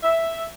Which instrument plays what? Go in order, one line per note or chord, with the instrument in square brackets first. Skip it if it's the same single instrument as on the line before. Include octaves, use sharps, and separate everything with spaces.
[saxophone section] E5